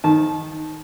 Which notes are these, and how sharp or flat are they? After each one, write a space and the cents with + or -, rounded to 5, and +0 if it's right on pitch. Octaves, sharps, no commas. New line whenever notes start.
D#3 +0 A5 -25